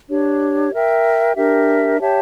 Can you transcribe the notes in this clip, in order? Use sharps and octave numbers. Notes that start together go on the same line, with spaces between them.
D4 G4 C#5
A#4 E5 G5
D4 G4 A#4 E5
G4 C#5 E5 A5